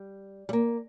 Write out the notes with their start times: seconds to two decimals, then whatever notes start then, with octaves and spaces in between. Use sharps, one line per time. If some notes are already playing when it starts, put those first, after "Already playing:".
Already playing: G3
0.49 G3
0.53 A#3